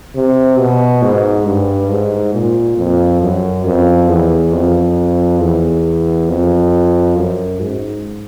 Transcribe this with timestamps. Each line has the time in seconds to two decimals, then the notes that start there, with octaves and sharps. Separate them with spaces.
0.16 C3
0.59 B2
1.03 G#2
1.46 G2
1.90 G#2
2.34 A#2
2.78 F2
3.22 F#2
3.66 F2
4.09 E2
4.53 F2
5.41 E2
6.29 F2
7.16 F#2
7.60 G#2